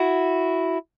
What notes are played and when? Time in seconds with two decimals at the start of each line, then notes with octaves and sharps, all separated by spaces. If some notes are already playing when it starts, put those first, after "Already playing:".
Already playing: E4 F#4